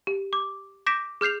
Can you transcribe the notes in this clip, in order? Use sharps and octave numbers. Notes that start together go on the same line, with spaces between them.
G4
D6
D6 G6 A#6 B6 D7 E7
G#4 F6 G6 C7 F7